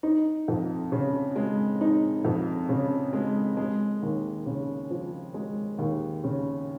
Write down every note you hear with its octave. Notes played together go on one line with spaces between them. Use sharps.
D#4
F2
C#3
G#3
D#4
F2
C#3
G#3
G#3
D#2
C#3
F3
G#3
D#2
C#3